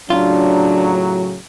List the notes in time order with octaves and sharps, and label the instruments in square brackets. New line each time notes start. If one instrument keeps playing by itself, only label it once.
[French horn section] A2 C#3 F#3 [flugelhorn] D4 [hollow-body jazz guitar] F4